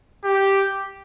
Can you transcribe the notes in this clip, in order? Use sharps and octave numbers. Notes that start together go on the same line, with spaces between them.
G4